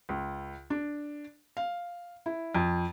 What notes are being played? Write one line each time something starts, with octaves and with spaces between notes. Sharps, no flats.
C#2
D4
F5
E4
F2